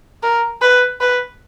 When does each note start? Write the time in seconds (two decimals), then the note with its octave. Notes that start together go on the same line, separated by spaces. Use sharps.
0.23 A#4
0.62 B4
1.01 B4